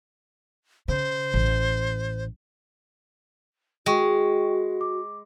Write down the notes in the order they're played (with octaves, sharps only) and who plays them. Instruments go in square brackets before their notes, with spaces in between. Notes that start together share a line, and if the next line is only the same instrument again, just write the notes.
[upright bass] C#3 [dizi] C5
[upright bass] A1
[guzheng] G#3 [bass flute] F#4 [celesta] D#5 G5 C#6
[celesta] D6